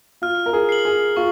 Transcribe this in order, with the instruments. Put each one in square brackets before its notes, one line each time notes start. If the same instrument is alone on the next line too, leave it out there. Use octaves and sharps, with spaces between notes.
[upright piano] F4 [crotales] F6
[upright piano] A#4
G#4
[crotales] C7 F#7
[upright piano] G#4
[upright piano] F4 [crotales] C#6